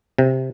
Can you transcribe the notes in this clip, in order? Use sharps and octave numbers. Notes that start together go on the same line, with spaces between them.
C3